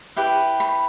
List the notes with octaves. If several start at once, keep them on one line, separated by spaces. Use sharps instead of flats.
E4 G4 B4
B5